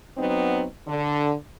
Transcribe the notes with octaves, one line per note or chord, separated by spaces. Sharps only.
F#3 B3 C4 D#4
D3